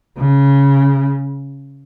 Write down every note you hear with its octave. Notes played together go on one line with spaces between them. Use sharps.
C#3